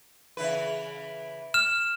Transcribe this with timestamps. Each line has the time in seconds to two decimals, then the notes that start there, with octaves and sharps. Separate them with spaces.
0.37 C#3 E3 B4
1.54 F6 E7